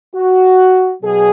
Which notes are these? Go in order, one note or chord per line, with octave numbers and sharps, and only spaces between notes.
F#4
B2 F#3 G#4